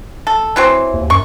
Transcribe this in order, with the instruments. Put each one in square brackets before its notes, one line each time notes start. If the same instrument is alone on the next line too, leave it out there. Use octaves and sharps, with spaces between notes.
[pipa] A4
E3 F#3 C4
[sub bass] D#2
[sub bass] F#2 [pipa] C#6